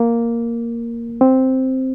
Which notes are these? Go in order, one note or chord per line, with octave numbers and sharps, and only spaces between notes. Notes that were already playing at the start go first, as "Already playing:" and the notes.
Already playing: A#3
C4